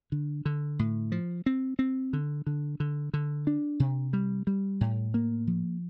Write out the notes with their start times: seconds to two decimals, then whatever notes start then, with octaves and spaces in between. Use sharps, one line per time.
0.12 D3
0.45 D3
0.79 A2
1.12 F3
1.46 C4
1.79 C4
2.13 D3
2.47 D3
2.80 D3
3.14 D3
3.47 D4
3.80 C3
4.13 G3
4.47 G3
4.81 A2
5.14 A#3
5.47 F3